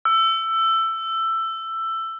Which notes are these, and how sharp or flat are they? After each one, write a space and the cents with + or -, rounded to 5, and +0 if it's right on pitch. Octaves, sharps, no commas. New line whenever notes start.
E6 +15